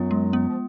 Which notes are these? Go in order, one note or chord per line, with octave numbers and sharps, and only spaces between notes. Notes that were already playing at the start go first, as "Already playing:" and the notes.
Already playing: F#2 F#3 B3 F4
G#3
B3
F3